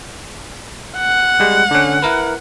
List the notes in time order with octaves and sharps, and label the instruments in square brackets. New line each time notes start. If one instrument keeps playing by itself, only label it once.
[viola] F#5
[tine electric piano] G3 G#3
D3 C#4
E4 A#4 B4